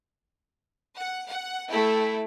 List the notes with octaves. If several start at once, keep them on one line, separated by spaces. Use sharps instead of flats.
F#5
F#5
A3 E4 G5